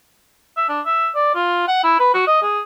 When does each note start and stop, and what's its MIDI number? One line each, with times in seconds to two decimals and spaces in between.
0.57 0.66 76
0.69 0.81 62
0.86 1.09 76
1.15 1.33 74
1.35 1.67 65
1.68 1.80 78
1.84 1.95 64
1.99 2.09 71
2.14 2.22 66
2.27 2.41 75
2.42 2.60 68